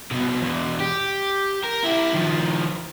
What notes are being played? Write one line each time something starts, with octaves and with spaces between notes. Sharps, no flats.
C2 B2
E2 B2
G4
A#4
E4 G4
D#3 F3